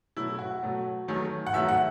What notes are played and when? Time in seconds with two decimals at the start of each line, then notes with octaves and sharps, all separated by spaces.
0.16 B2 F#3 A3 E4
0.39 F#4
0.63 B2 F#3 A3
1.08 E2 D#3 F#3 A3
1.47 F#5
1.53 E2 D#3 F#3 A3 E5
1.69 F#5